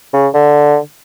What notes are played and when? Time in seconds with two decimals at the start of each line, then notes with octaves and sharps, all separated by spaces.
0.13 C#3
0.34 D3